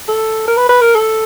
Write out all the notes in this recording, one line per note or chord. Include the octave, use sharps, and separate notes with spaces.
A4
A#4
B4
B4
A#4
A4